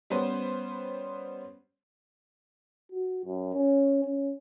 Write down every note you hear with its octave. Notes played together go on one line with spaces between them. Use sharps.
G3 B3 C#4 B4 C5
F#4
F#2
C#4
C#4